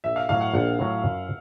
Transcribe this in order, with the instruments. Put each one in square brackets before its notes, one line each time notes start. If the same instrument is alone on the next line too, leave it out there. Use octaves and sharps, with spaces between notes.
[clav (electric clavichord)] A#1 [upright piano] E5
[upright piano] F5
[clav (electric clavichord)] A2 F#3 [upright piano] F5
[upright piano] F#5
[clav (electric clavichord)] A#1 [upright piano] F#5
[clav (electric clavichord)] A2 F#3
F#2